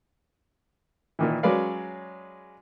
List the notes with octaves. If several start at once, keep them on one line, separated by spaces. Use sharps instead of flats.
A#2 D#3 E3
F#3 G#3 C#4 B4 D5 F5